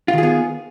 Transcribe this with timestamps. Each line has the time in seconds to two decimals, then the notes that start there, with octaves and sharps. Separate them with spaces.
0.08 F4
0.13 D#3
0.18 G#4
0.23 B3